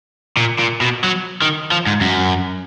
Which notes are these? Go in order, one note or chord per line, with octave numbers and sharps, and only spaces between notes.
A#2
A#2
B2
F#3
D#3
F3
G#2
F#2